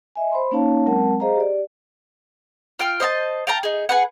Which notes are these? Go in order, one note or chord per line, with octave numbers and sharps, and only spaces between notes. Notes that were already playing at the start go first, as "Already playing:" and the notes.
D#5 E5 G#5
C5 B5 C6
A#3 C#4 D#4 C#5 F5 A5
F#3 G#3 C4 A#4 F#5 A5
G#4 C5 D#5 F5 A#5
G4 D5
F4 G5 F6
C5 D#5 E5 A5
F5 G5 A5 A#5
D#4 G#4
G#4 B4 F#5